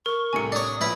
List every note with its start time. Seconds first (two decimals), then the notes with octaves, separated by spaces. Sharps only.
0.06 A#4 C#6
0.33 C2 A2 C3 G#5 C#7
0.52 D4 C#5 D#6
0.81 A#1 E4 B4 C#5